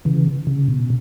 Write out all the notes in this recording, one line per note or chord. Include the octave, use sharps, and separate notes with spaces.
C#3 E3
C#3
B2